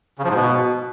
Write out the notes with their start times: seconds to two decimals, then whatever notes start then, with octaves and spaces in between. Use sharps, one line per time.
0.19 C#3
0.24 F3
0.29 G#2
0.34 B2